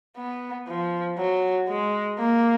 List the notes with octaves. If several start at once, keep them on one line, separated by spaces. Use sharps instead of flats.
B3
F3
F#3
G#3
A#3